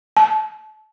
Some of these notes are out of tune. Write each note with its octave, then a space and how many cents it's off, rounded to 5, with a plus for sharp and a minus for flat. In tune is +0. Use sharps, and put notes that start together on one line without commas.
A5 -30